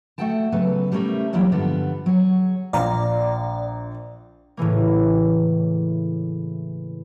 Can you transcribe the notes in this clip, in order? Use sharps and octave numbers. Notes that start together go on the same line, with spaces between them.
A3 F#4 A4 F#5 G5 A5
C#3 F#3 B3 A4 B4
G3 A3 B3 C#4 A#4 E5
E2 F#3 G3 A#3 E4 G5
G2 D3 F3 B3 A4
F#3 G#4 C#5
A#1 D5 F5 A#5
A2 C#3 E3 A#3